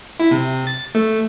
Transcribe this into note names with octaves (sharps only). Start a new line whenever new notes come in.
E4
C3
A6
A3